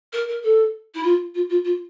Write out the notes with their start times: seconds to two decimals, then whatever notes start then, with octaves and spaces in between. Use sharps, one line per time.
0.13 A#4
0.28 A#4
0.43 A4
0.95 E4
1.03 F4
1.35 F4
1.49 F4
1.65 F4